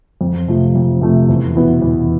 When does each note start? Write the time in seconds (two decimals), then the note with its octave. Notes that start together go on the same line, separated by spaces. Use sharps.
0.21 F2
0.48 C3 F3 A3
0.75 F2
1.01 C3 F3 A3
1.29 E2
1.56 B2 B3 E4
1.82 E2